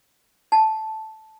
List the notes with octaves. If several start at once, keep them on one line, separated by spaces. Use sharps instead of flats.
A5